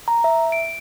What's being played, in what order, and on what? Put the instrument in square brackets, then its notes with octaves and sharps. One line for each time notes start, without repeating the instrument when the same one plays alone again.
[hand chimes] A#5
E5
D7